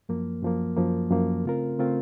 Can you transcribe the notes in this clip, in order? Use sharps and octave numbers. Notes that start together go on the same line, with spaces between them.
F#2 F3 A#3
F#2 F3 A#3
F#2 F3 A#3
F#2 F3 A#3
C#3 A3 C4 F4 A#4
C#3 A3 C4 F4 A#4